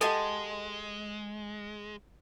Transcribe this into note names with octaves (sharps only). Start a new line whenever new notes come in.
G#3 G4 A4 D#5 F#5 G#5 A5 C6